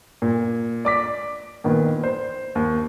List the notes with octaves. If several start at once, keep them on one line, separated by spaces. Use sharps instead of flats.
A#2
D5 D6 B6
A#2 D#3 B3
C5
D#2